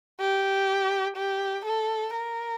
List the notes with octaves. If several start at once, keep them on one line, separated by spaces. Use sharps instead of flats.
G4
G4
A4
A#4